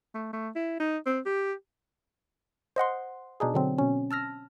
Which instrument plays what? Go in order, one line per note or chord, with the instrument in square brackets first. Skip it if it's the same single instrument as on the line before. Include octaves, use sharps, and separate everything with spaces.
[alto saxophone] A3
A3
E4
D#4
C4
G4
[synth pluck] C5 D#5 F#5 C6
B2 D4 D#4 G#4
D3 F#3 C4
B2 C#4
A5 E6 F6 A#6